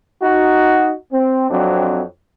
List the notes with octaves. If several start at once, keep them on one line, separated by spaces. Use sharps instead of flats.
D#4 F#4
C4
F2 F#3 C4 D4